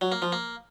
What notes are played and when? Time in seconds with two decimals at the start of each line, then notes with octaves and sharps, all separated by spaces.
0.01 F#3
0.12 A#3
0.22 F3
0.32 A#3